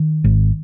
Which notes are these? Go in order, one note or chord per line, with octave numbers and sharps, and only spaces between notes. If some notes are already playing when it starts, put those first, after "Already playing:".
Already playing: D#3
G#1